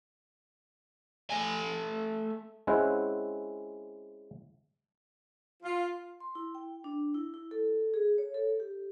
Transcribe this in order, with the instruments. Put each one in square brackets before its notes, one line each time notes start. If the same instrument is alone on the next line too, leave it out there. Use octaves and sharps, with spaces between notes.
[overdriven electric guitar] A3 G#5
[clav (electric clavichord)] G#3 C4 C#4 E4 F#5 G5
[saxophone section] F4
[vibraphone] C6
E4
G5
D4
E4
E4
A4
G#4
C#5
A4
G4